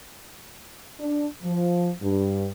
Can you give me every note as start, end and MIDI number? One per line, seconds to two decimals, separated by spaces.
0.99 1.25 62
1.42 1.90 53
2.01 2.47 43